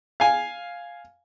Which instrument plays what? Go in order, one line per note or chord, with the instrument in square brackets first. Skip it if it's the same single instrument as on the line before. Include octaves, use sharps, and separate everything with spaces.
[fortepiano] F5 G#5